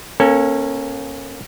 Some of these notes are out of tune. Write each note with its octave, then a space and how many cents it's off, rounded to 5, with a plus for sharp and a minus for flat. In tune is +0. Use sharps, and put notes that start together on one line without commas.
A#3 +20 C#4 -20 A4 +25